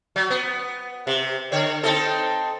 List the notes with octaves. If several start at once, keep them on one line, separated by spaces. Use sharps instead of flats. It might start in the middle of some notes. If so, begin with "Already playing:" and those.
F#3
B3
C3
D3 C#5
C4 D#4 A4